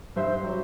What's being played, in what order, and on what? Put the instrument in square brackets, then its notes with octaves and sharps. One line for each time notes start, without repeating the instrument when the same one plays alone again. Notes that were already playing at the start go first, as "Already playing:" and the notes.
[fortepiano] G2 C5 E5
F#3